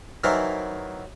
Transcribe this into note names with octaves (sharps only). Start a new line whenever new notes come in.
D#3 E3 F#3 E4 A#4 C5